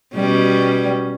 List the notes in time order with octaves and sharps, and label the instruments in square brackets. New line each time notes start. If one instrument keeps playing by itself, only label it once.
[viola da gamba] B2 G3 C#4